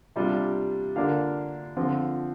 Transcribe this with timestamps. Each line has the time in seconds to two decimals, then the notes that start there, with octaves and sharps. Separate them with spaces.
0.16 C3 G3 D4 F4
0.96 D3 A#3 D4 F4 F5
1.77 D3 F3 C4 F4